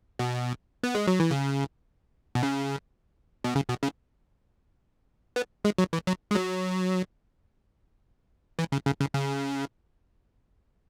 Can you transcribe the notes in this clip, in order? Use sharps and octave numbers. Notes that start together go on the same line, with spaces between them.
B2
B3
G#3
F#3
E3
C#3
B2
C#3
B2
C#3
B2
C#3
B3
G#3
F#3
E3
F#3
G#3
F#3
E3
C#3
C#3
C#3
C#3